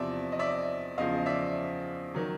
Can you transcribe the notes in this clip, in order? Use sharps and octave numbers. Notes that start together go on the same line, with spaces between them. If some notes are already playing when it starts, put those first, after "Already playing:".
Already playing: E2 C3 F3 D5 E5
D#5
D5 E5
E2 C#3 F3 D#5 F5
D5 E5
D#3 F#3